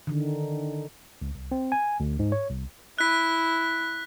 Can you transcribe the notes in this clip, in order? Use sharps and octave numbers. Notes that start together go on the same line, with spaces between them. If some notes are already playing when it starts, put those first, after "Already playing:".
D3 D#3
C#2
C2
C4
G#5
D2
G#2
C#5
C2
E4 F#6 B6